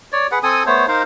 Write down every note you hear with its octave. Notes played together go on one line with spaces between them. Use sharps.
C#5 D5
G#4 B4 F#5
C4 A4 G#5 D#6
A3 B3 C5 C#5
D#4 A#4 C5 F5